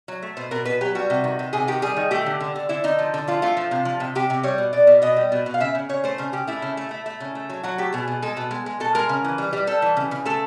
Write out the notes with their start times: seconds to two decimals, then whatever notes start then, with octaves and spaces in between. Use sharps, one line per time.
0.08 F#3
0.22 A3
0.37 B2 C5
0.51 B2 A#4
0.65 B2 B4
0.81 F#3 G4
0.95 G3 F#4
1.10 C3
1.24 D#3
1.39 C3
1.53 C3 G#4
1.68 D#3 G4
1.82 G3 G#4
1.96 D#3
2.11 A3 G4
2.26 D3
2.40 D3
2.56 D3
2.69 D3 E4
2.84 D3 D#4
2.99 F3
3.14 D3
3.27 F3 F4
3.42 A3 F4
3.57 F3
3.71 C3
3.85 F3
4.00 C3
4.15 C3 G4
4.30 C3
4.43 G3 C#5
4.58 B2
4.73 B2 D5
4.87 B2
5.02 B2 D#5
5.16 G3
5.32 B2
5.46 B2
5.54 F5
5.60 C#3 E5
5.75 C#3
5.89 C#3 C#5
6.04 A3 C5
6.18 C#3 C5
6.33 C#3 G4
6.47 A3 E4
6.62 C#3
6.77 A3
6.91 A3
7.06 A3
7.20 C#3
7.35 A3
7.49 F#3
7.63 F#3 F#4
7.78 A3 G4
7.92 B2 G#4
8.07 B2
8.22 G#3 A4
8.37 B2
8.51 G#3
8.66 G#3
8.80 B2 A4
8.95 G#3 A#4
9.09 C#3
9.24 E3
9.38 G3
9.53 G3
9.67 G3 A4
9.82 E3
9.97 C#3
10.11 C#3
10.25 A3 A4